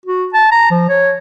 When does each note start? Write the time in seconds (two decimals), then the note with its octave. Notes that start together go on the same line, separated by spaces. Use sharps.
0.06 F#4
0.34 A5
0.52 A#5
0.71 F3
0.89 C#5